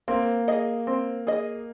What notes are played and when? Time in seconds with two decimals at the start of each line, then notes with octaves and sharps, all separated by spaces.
0.08 A#3 C4
0.48 G#4 D#5
0.87 C4
1.27 G#4 D#5